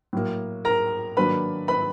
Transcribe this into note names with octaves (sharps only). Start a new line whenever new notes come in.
A2 F#3 A#3
A#4 A#5
D#3 F#3 A#3 D4 B4 B5
B4 B5